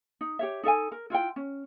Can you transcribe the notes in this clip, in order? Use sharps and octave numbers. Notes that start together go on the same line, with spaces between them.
D#4
G4 C#5 E5
D#4 A4 E5 G#5
A#4
E4 F4 F#5 G5
C#4